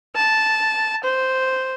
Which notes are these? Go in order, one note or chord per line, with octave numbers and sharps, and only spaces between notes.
A5
C5